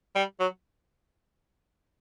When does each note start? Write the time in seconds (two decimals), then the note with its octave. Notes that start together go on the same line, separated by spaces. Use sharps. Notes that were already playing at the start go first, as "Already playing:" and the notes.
0.15 G3
0.40 F#3